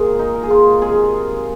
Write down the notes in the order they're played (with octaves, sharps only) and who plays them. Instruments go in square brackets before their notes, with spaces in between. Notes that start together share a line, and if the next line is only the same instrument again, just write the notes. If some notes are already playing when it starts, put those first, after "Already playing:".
Already playing: [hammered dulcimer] A#2 G#3 G#4 A#4
D#4
A#4
G#4
F4
C3 D#3 G#3 G#4